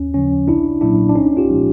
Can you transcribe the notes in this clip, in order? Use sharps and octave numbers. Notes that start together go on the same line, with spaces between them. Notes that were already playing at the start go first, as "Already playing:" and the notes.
Already playing: D#2 C#4
C#3 F3 C#4
B1 D4 E4
A#2 F#3 A#3 C#4 D4 E4
D4
C2 C#4 D#4
F4 G4
A#2 F3 G#3